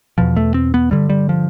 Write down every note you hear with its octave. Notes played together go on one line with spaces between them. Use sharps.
E2 B2 F3
A3
C4
B3
G2 D3 G3
G3
F3